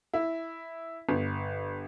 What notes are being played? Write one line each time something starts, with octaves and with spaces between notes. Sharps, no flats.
E4
G1